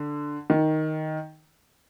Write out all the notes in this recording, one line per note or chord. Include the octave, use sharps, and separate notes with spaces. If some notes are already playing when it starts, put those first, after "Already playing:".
Already playing: D3
D#3